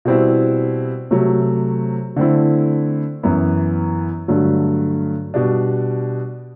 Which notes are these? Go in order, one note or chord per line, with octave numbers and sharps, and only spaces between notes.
B2 G3 C4 E4
C3 F#3 A3
D3 A3 C4 E4
F#2 E3 B3 E4
G2 D3 F#3 A3
B2 G3 D4